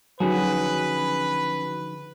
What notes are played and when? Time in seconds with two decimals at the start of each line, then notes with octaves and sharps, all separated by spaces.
0.20 D3 F3 F#3 C#4 D#4 F#4 G#4 B4